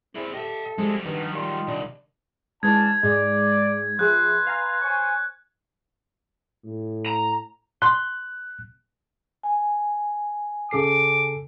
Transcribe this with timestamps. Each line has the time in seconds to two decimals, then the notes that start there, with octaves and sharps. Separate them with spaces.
0.15 C4 E4 G#4 D5
0.34 G4 A4 D#5 E5
0.78 C3 F3 G3 G#3
1.06 G2 D#3 B3
1.35 A#2 F4
1.68 C2 D4
2.63 E3 G#3 C#4 D4 A5 G#6
3.03 G#2 G#3 D5
3.99 F3 G#4 B4 E5 C6 F#6
4.47 F5 G#5 A#5
4.82 C5 C#5 G#5 C#6
6.65 A2
7.06 A#5
7.82 C6 F#6
9.43 G#5
10.71 C#3 A4 D6 C7